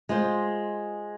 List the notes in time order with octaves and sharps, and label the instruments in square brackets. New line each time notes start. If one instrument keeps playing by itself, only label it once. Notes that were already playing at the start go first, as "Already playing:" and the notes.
[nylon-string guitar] G#3 F4 C5